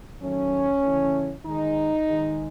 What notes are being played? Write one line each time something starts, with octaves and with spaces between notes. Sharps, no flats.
D#3 F#3 A3 C#4
C#3 E3 A3
D#3 G#3 D#4
D#3 G#3